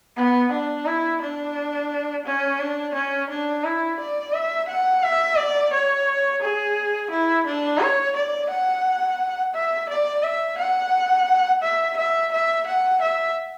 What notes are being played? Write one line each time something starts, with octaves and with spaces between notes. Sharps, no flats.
B3
D4
E4
D4
C#4
D4
C#4
D4
E4
D5
E5
F#5
E5
D5
C#5
G#4
E4
D4
C#5
D5
F#5
E5
D5
E5
F#5
E5
E5
E5
F#5
E5